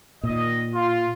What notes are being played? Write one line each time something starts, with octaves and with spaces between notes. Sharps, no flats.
A#2 D#3 D#5
F4